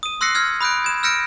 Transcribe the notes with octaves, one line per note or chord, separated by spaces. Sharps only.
D#6 D#7
C6 E6 F#6 A#6 C7 C#7
E6 F6 G#6 C7
B5 D#6 F#6 G6 D7
G#6 E7
E6 F6 G6 A#6 C#7 D7